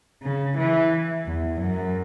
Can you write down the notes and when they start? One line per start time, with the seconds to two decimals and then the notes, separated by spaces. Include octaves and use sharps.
0.23 C#3
0.58 E3
1.27 E2
1.61 F#2